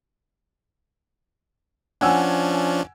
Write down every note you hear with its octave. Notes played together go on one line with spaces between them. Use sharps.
F3 C#4 D4 F#5 G#5 E6